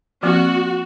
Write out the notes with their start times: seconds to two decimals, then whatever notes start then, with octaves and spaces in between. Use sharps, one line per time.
0.23 F3 A#3 C4 F#4